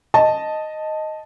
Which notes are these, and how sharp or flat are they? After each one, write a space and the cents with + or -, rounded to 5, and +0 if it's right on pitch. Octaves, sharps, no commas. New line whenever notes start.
D#5 +0 A5 +0